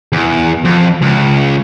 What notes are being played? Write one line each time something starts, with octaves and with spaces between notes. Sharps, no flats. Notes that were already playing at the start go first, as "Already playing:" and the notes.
E2
F2
C#2